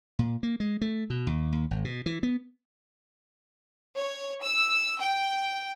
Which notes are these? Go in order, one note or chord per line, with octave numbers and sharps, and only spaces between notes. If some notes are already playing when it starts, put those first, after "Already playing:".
A#2
A#3
G#3
A3
B2
D#2
D#2
G#1
B2
E3
B3
C#5
E6
G5